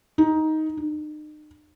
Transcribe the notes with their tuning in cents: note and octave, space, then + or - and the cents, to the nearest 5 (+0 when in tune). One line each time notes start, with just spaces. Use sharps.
D#4 +10
D#4 -40